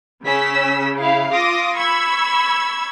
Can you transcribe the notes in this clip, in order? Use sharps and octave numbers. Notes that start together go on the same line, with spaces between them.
C#3 C#4 E6 B6
E4 F5
F4 D6 D#6 A#6
B5 C#6 E6 G#6